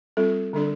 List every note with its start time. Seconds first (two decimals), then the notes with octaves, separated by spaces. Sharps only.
0.17 G3 C4 F4 A4
0.53 D3 G3 D4 A4 D5